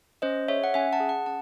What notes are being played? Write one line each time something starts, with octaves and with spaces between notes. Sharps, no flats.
C#4 C5 D#5
G#4 C#5 E5
F#5
C#4 E5 G#5
F#5 A5
G#4
F#5 A5
C#4 A5